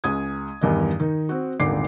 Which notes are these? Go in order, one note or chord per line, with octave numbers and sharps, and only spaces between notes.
C#2 G#3 D#6 G#6
E2 G2 D#3 D#5
D#3 D#4
C4 F#4
D#1 G#1 D3 D#4 D6 C7